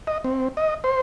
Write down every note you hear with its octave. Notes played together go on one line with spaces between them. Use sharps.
D#5
C4
D#5
C5